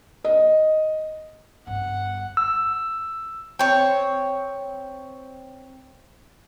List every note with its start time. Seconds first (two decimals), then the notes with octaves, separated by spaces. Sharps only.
0.25 D#5
1.67 G1 G2 F#5
2.37 E6
3.59 C4 C#5